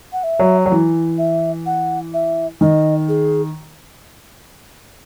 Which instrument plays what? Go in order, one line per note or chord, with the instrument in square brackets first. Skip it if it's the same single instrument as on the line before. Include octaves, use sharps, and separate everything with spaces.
[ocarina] F#5
E5
[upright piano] F#3
F#3
E3
[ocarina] E5
F#5
E5
[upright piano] D#3 [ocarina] D#5
[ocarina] G#4